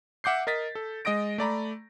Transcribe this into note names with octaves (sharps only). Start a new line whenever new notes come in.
E5 F#5 D6 G6 C7
A#4 D#5 A6 B6
A4
G#3 D#5 D#6 A#6 D7
A3 D5 A#5 B5